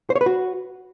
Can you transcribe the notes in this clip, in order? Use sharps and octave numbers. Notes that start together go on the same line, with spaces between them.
C5
C#5
B4
F#4